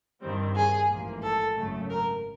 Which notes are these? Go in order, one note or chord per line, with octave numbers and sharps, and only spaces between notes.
G2 D#3 G3 C4
G#4
A1 G#2 F3 A#3
A4
G#1 F#2 C#3 F#3 A3
A#4